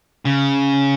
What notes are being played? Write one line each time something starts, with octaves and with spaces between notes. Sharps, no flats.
C#3